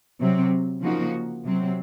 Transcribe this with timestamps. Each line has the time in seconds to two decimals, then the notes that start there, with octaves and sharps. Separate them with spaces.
0.19 C3 F#3 C4
0.82 C#3 F3 A#3 D#4 F#4
1.44 C3 F#3 C4